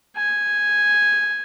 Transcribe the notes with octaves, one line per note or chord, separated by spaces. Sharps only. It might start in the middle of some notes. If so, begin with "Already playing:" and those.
G#5